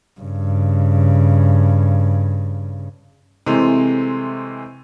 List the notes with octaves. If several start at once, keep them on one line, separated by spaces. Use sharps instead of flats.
G2 C#3
C3 E3 G#3 A3 C4